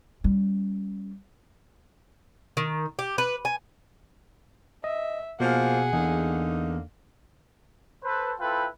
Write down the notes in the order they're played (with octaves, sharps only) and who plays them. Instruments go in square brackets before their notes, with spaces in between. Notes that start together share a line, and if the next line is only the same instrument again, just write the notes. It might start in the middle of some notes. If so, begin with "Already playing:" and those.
[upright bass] G3 C#4
[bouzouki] D#3
G4
B4
G#5
[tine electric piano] D#5 [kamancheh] E5
[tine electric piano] B2 [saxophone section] F3 A#3 [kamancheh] G#4 F#5
[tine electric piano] E2 [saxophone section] D3 A#3 D#4
[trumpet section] A4 B4 C5
C4 E4 F4 A4 B4 G5